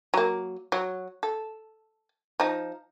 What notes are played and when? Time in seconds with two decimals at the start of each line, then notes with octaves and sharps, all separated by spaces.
0.14 F#3 A#3
0.72 F#3
1.23 A4
2.40 F3 D#4